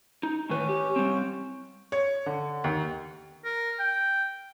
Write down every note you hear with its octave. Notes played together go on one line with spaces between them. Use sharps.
D#4
A2 D#3 C#4 B4
G4
G3 C4
C#5
D3
D#2
A#4
G5